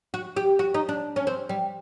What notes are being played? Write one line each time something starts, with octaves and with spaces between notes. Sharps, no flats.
F#4
G4
F#4
D#4
D4
C#4
C4
G3